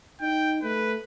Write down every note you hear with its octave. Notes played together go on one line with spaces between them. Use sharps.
D#4 G5
A3 B4